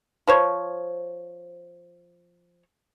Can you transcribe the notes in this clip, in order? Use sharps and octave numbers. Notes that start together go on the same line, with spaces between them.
F3 C5 C#5